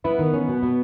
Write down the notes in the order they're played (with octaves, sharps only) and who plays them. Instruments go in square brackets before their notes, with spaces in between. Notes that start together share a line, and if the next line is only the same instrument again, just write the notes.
[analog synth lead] B3 [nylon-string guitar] E4
[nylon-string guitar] D#3
C#4
B2
B2